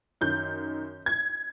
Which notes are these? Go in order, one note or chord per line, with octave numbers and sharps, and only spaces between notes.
F#2 D#3 G6
G#6